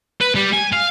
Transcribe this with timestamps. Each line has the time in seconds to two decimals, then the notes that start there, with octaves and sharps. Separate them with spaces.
0.21 B4
0.35 G3
0.53 G#5
0.72 F5